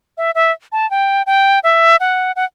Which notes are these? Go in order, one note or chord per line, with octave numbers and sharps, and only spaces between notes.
E5
E5
A5
G5
G5
E5
F#5
F#5